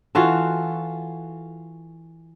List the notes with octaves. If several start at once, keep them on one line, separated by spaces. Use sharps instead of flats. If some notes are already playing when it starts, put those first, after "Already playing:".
E3 F4 F#4 A4